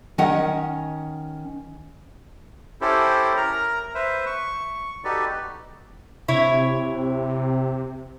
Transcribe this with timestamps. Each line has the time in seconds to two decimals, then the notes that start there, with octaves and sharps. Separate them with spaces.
0.18 D#3 C#4 D#5 F#5
2.81 C#4 E4 G4 A4 C5
3.37 A#4 A#5
3.95 B4 C5 E5
4.26 C#6
5.04 D#4 F#4 G4 A4 B4 D5
6.28 C3 E4 C#5